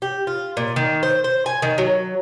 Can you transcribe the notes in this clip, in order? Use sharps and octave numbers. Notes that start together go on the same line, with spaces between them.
G4
F4
A#2
D#3
C5
C5
G#5
D#3
F#3